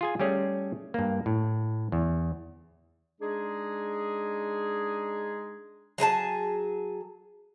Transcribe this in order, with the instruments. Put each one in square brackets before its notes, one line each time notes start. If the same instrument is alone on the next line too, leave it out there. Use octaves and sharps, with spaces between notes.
[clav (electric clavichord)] F4 G#4 G#5
G3 A3 C#4 G#4
G2 A#3
A2
E2
[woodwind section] G#3 D4 D#4 G#4
[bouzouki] F#3 G#4 B4 A5